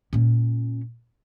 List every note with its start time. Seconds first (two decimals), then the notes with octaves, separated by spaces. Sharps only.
0.13 A#2 C#4